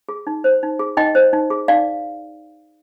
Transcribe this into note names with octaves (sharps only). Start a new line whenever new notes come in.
G#4
D#4
C5
D#4
G#4
D#4 D#5 G5
C5
D#4
G#4
D#4 D5 F5